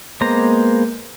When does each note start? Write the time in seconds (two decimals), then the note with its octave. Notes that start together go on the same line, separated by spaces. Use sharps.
0.21 G#3 A#3 B3 C5 A#5